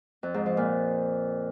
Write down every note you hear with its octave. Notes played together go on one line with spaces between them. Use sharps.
F2
G#2
F3
A#2